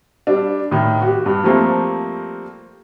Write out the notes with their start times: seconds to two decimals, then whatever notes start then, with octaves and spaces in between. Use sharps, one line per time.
0.27 G3 D4
0.71 A2 D#3
1.02 F#4 G4
1.26 G2
1.44 F3 G3 A3 A#3 C4